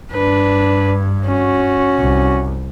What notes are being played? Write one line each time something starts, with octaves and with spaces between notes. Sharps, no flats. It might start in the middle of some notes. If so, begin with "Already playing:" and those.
G2 D4 B4
C#4 F#4
C2